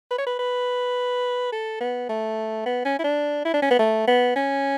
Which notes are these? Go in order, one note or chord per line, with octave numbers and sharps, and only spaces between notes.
B4
C#5
B4
B4
A4
B3
A3
B3
C#4
E4
D4
E4
D4
C#4
B3
A3
B3
C#4